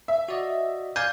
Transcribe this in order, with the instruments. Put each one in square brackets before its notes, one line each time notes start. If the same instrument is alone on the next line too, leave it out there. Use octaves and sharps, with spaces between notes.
[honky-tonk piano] E5
[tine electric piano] F#4 D5 D#5
[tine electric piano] D5 F5 G#5 [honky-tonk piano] G6